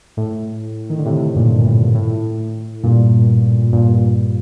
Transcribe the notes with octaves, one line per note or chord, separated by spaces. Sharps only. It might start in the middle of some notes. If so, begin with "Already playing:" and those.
A2
D#3
D3
A2 C3
G2 A#2
A2
A2
G2 A#2
G2 A#2